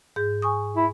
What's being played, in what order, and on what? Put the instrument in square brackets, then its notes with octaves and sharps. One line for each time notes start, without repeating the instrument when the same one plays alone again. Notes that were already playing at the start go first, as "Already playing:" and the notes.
[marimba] G#2 G#4 G6
G#5 C#6 D#6
[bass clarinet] E4